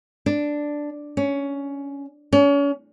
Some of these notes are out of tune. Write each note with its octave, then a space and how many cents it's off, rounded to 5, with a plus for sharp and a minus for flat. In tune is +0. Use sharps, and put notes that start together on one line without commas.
D4 +0
C#4 +15
C#4 +35